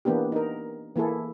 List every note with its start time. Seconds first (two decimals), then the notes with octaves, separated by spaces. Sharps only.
0.05 E3 A#3 B3 D4 G4
0.32 D#4 A#4
0.96 E3 A#3 E4 G#4 A4